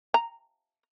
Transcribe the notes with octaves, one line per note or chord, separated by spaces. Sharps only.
A#5